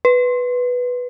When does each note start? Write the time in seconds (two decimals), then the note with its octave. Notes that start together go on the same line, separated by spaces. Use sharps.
0.05 B4